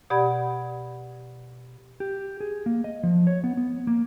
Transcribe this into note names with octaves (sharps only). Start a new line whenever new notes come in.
B2 G4 D5 F#5 B5 G#6
G4
G#4
A#3
D#5
F3
C#5
B3
B3
A#3